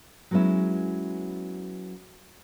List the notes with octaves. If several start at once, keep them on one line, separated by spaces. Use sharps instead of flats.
F#3 G#3 B3 C#4 E4